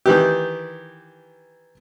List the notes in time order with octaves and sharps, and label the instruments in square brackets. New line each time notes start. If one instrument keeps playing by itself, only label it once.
[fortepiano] D#3 E3 G4